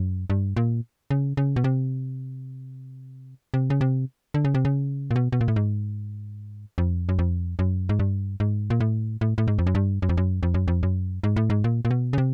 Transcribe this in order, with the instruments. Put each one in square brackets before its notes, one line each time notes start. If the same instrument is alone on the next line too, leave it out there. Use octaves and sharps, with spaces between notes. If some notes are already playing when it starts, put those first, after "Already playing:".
Already playing: [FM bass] F#2
G2
A#2
C#3
C#3
B2
C3
C3
C#3
C3
D3
C#3
C3
C#3
A#2
B2
B2
A#2
A2
G#2
F2
F#2
F2
F#2
G#2
G2
G#2
A#2
A2
A2
A2
G#2
F2
F#2
G2
F#2
F2
F#2
F2
F#2
F2
F#2
G#2
A2
G#2
A#2
A#2
B2
C#3
C3